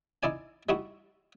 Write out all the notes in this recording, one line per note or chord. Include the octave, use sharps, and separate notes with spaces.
D#4 E4 D5 G#5
G3 D#4 E4 F#4